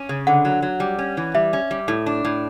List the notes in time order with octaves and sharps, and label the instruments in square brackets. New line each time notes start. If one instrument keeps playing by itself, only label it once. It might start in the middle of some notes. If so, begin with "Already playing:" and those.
Already playing: [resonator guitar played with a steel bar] C#4
C#3
[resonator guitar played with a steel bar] D3 [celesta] F#5
[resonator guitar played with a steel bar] F#3
F#3
G3
C#4
E3
[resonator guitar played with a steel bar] G3 [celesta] E5
[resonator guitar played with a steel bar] C#4
G3
A2
D4
A2